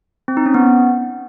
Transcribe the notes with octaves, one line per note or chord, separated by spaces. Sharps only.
C4
D#4
C#4
B3